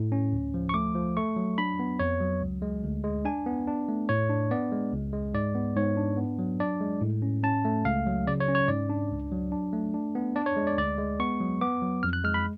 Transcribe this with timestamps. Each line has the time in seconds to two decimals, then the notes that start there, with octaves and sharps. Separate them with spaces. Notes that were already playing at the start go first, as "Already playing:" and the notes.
Already playing: A2
0.12 C#4
0.33 D2
0.54 F3
0.69 C#6
0.74 A3 D6
0.95 F3
1.17 A3 C#6
1.36 F#3
1.58 D4 B5
1.79 B3
1.99 F2 C#5
2.20 F#3
2.41 C#2
2.62 G#3
2.84 D2
3.04 G#3
3.25 D4 G#5
3.46 B3
3.67 D4
3.88 A3
4.09 A2 C#5
4.30 D4
4.51 B3 D5
4.72 G#3
4.92 C#2
5.13 G#3
5.34 G#2 D5
5.55 B3
5.76 G#2 C#5
5.97 D4
6.17 B3
6.39 F#3
6.60 D4 D5
6.81 G#3
7.01 A2
7.22 C#4
7.43 C#4 A5
7.65 A3
7.84 C#2 F5
8.06 F#3
8.27 C#3 D5
8.40 C#5
8.48 C#4
8.55 C#5
8.68 G#2 D5
8.89 D4
9.11 C#2
9.32 F#3
9.52 D4
9.73 A3
9.94 D4
10.15 B3
10.36 D4 D5
10.46 C#5
10.57 G#3
10.67 D5
10.78 D2 D5
10.98 G#3
11.19 B3 C#6
11.40 F#3
11.61 B3 D6
11.82 F#3
12.03 F2 F6
12.13 F#6
12.24 G#3 F6
12.34 B5